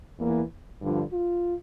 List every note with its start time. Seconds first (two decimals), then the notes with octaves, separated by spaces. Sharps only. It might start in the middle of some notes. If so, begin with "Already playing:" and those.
0.19 E2 E3 A#3
0.80 G2 D3 F3
1.11 F4